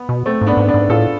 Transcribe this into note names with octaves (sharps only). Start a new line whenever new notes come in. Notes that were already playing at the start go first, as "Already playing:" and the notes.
Already playing: B3
B2
A3 C4
G#2
B3 D4
G#2
B3 D4
G#2
A2 F4 A4